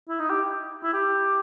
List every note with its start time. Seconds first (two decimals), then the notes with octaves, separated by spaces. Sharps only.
0.09 E4
0.20 D#4
0.30 G4
0.83 E4
0.93 G4